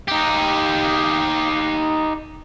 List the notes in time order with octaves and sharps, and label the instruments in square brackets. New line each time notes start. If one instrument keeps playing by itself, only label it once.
[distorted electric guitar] D#4 G4